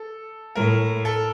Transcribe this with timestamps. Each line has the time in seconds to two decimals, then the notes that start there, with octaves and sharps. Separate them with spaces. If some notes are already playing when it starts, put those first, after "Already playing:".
Already playing: A4
0.55 A2 A#4
1.05 A4